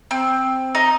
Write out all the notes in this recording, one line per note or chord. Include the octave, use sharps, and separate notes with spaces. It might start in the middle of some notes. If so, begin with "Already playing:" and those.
C4
D#4